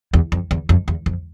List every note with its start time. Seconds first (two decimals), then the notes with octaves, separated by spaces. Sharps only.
0.14 E2
0.32 F2
0.51 E2
0.69 F2
0.88 E2
1.06 F2